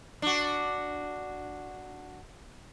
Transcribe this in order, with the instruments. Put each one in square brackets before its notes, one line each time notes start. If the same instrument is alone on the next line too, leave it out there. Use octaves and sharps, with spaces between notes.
[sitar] D4 F#4